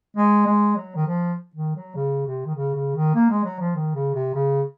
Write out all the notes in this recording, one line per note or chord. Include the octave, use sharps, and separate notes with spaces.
G#3
G#3
F#3
D#3
F3
D#3
F#3
C#3
C3
D#3
C#3
C#3
D#3
A#3
G#3
F#3
F3
D#3
C#3
C3
C#3